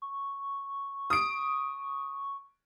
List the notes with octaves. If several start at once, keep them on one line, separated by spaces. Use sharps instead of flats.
C#6
D#6 D7